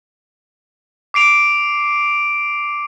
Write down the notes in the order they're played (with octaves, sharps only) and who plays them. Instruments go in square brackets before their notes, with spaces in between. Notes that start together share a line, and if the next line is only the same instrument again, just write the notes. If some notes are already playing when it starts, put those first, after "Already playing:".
[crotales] D6 C7 D7 F7